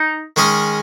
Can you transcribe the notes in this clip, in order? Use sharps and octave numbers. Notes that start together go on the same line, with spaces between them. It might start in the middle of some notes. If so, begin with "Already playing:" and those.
Already playing: D#4
D#3 G#3 C#4 G#4 D#5